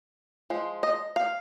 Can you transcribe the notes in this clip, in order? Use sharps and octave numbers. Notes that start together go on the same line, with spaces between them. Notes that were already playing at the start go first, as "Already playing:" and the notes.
F3 G#3
D#5
F5